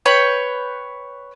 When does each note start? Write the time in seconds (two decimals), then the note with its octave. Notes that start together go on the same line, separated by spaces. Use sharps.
0.06 B4 C#5 G5 B5